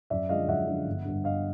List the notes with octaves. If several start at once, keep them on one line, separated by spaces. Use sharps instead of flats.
F#2 D5 E5
D3 F3 G#3 D#5 F5
F#2 E5 F#5
D3 F3 G#3
G1
G2 D3
G1 D#5 F5